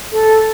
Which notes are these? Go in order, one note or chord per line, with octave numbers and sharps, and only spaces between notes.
A4